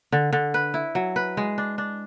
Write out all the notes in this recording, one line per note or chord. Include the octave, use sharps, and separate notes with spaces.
D3
D3
B4
E4
F#3
B4
G#3
D4
D4